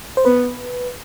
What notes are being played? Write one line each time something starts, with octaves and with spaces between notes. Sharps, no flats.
C5
B3 B4